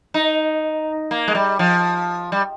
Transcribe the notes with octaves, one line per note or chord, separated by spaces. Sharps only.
D#4
A#3
G#3
G3
F3
G3